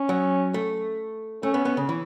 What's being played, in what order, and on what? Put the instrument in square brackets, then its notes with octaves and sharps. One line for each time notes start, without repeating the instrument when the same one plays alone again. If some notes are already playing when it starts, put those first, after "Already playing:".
Already playing: [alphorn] C#4
[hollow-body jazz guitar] F#3
A3
[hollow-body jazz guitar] A3 [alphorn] C#4
[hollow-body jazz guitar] B3
B3
C#3
E3